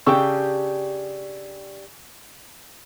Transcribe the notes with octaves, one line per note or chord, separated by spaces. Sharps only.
C#3 D4 G4 G5 C#6 E6